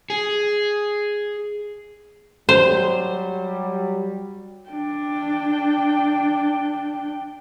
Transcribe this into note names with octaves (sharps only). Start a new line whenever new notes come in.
G#4
F#3 G3 C5
D4 G5